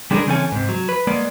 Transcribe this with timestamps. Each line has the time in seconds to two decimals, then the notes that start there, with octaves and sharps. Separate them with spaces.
0.11 G3 G#3 D4 F4 G#4 A#4
0.27 C#3 E3 C4 C#4 A4 G#5
0.52 G#2 C3
0.69 F#3
0.89 B4
1.07 G#3 A#3 B3 D5